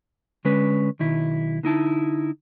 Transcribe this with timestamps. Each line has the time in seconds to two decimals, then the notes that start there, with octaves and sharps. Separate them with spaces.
0.45 D3 G#3 C#4 B4
1.00 B1 D#3 E4
1.63 D3 D#4 E4 A5